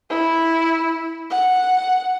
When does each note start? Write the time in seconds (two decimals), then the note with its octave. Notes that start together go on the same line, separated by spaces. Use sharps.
0.10 E4
1.31 F#5